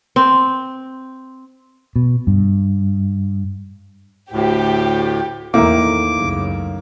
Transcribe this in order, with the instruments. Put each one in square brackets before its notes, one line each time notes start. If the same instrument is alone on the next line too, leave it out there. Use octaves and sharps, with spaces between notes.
[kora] C4
[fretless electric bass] B2
G2
[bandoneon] D2 A2 [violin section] G4
[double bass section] E2 [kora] A2 D#3 [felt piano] A#3 [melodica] D6
[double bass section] C#2 F#2 C#3